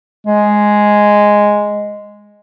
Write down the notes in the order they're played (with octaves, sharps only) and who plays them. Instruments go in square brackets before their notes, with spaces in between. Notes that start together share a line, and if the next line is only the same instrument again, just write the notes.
[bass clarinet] G#3